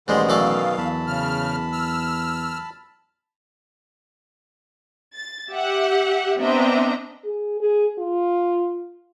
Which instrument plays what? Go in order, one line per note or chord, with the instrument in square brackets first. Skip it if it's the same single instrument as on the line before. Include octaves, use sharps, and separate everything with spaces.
[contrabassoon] A1 [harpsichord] G#2 G3 G#3 [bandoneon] B2 D#3 B3 [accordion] C6
[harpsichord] F#2 A4 D5 [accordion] F5
[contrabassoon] E2 [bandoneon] A5 B5
[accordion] C#3 F6
E6 F6
[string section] A6
G4 E5 F#5
B3 C4 D4 D#5 E5 A#5
[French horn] G#4
G#4
F4